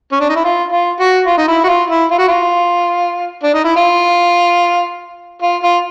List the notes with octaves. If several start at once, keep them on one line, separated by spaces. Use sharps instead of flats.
C#4
D4
D#4
E4
F4
F4
F#4
F4
D#4
E4
F#4
F4
E4
F4
F#4
F4
D4
D#4
E4
F4
F4
F4